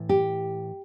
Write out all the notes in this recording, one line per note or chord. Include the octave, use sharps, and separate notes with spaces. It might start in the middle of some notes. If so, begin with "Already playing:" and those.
Already playing: A2 E3
G4